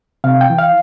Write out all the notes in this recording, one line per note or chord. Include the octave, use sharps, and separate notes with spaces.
C3 F5
G5
E3
F5